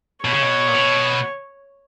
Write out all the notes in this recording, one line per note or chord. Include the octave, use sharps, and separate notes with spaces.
B2 C#5
C#3
B2
A#2
B2